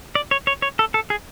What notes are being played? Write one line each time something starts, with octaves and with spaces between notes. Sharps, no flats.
D5
C#5
C#5
C#5
A4
A4
G#4